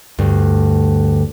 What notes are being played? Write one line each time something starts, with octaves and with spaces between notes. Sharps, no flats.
D2 G2